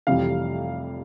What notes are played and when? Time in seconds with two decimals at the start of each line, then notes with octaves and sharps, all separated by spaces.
0.07 F1 F2 C3 E3 G3 F5